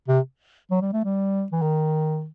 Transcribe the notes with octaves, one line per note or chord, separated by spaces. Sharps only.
C3
F#3
G3
A3
G3
E3
D#3